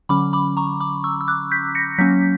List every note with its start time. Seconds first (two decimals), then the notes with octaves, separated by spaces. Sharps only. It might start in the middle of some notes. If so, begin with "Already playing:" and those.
0.09 D3 F#3 C#4 B5 D6
0.33 B5 D6
0.57 A#5 C#6
0.81 B5 D6
1.04 C#6 E6
1.21 E6
1.28 D6 F#6
1.51 G6 B6
1.75 A#6 C#7
1.98 F#3 A#3 C#4 G6 B6